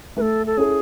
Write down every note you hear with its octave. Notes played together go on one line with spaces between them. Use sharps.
A3 A4 B4
A4
C#4 E4 G#4 A4